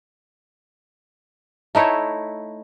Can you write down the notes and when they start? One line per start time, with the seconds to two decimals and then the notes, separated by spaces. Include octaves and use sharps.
1.75 A3 D#4 E4 C#5